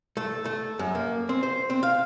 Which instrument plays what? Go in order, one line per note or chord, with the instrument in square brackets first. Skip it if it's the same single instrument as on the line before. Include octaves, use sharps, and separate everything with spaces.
[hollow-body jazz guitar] A3
A3
F#2
A#3
C4
C5
C4
F5